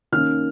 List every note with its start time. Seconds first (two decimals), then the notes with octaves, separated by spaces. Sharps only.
0.12 D#3 A#3 C#4 F6